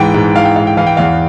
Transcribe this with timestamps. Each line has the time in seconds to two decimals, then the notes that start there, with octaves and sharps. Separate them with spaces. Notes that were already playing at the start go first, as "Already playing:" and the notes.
Already playing: G#2 E3 G5
0.14 G#2
0.35 E3 F5
0.45 G5
0.56 G#2 F5
0.67 G5
0.77 E3 F5
0.86 G5
0.97 E2 F5